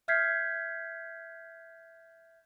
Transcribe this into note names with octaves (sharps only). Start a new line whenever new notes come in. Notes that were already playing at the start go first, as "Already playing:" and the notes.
E5 F6 G6 G#6 B6 C7